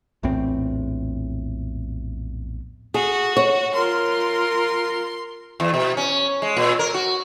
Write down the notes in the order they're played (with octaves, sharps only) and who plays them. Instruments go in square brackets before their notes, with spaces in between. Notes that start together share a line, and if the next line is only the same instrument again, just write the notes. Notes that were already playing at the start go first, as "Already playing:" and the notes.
[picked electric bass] A#1 E2 A2 C4
[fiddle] F#4 [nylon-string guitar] G#4
[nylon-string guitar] C#5
[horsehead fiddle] F4 A#4 [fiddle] C6
[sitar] E2
B2
C#4
G#3
A#2
A#4
F#4